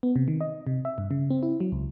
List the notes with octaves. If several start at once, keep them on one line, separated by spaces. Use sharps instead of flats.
B3
C3
D#3
D#5
C3
E5
G2
C#3
C4
E4
F#3
C#2